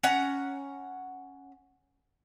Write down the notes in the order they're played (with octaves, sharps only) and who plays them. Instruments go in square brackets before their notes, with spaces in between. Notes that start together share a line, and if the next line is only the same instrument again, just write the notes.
[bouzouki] C#4 F#5 A#5